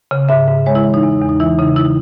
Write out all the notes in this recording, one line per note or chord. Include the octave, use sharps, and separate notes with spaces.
C#3
G#2 E5
G#2
G#3 C#5
E4
E3
D#4
E2
E2
D#4
E3 E4
C#3 D#4
E4